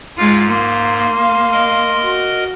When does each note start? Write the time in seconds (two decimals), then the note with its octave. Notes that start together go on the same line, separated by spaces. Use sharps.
0.18 G#2 G#3 F4
0.49 A#3 F5 C6
1.18 F5
1.52 A#4 D#5
2.04 F#4